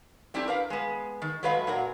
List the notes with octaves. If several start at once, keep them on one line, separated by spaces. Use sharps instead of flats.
A3 C4 D4 E4 G4
A#4 B4 F5
G#3 B3
D#3
F#3 G#3 A3 B4 D#5 F5
A#2 F#4 A#4